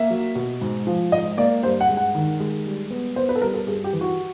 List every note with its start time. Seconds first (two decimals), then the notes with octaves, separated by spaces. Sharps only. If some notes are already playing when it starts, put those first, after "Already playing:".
Already playing: A#3 E5
0.10 F#3
0.35 B2
0.61 G#2
0.87 F3
1.12 G#2 D#5
1.37 A#3 D5
1.63 G2 C5
1.81 F#5
1.89 G#3
1.97 F#5
2.15 D#3
2.40 G#3
2.65 G3
2.90 B3
3.16 B3 C5
3.29 B4
3.35 A4
3.42 G3 A#4
3.54 A4
3.67 G2 G#4
3.84 G4
3.93 E3
4.01 F#4